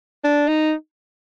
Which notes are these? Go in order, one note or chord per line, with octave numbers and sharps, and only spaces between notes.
D4
D#4